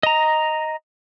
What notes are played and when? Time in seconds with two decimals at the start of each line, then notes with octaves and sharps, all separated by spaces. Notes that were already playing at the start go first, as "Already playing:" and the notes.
0.03 D#5 A#5